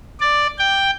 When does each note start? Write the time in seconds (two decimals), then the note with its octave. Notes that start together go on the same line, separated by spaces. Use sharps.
0.20 D5
0.59 G5